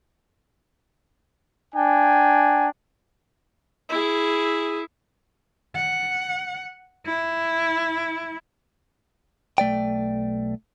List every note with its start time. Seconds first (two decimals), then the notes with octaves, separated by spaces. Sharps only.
1.75 D4 G5 G#5
3.89 E4 G#4
5.75 F#5
7.06 E4
9.58 B1 A3 D5 G5